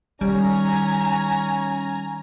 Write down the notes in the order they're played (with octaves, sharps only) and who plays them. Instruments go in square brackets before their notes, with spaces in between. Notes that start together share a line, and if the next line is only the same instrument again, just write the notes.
[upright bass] D#3 [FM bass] G3 [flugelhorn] C#4 [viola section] G#5 A#5